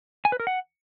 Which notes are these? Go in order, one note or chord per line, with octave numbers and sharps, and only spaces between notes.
G#5
B4
A#4
F#5